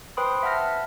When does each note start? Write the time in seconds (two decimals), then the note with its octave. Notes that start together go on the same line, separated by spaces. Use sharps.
0.17 B4 C5 G5 B5 C6 D#6
0.43 E5 F#5 A5 F6 A#6